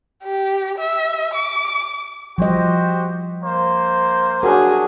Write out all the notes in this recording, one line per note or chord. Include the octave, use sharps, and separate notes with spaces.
G4
E5
D6
F3 G3 F#4 G4 C5 D#5
A#3 C5
F#3 C#4 D4 G#4 A#4